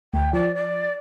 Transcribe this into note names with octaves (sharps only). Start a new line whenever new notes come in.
D2 G5
F3 D5
D5